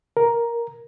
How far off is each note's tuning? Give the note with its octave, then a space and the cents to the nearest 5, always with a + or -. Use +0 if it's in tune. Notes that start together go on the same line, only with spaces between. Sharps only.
A#4 +5